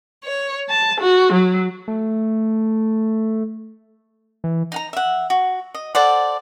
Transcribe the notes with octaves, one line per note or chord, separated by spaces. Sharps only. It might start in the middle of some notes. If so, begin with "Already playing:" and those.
C#5
A5
F#4
F#3
A3
E3
D#4 F#5 A#5
E5 F#5
F#4
D#5
A4 C5 D5 F#5